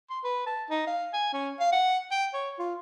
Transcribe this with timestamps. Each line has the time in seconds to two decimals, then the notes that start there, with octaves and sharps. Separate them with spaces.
0.10 C6
0.24 B4
0.46 A5
0.70 D#4
0.87 F5
1.13 G#5
1.33 C#4
1.60 F5
1.72 F#5
2.11 G5
2.33 C#5
2.59 F4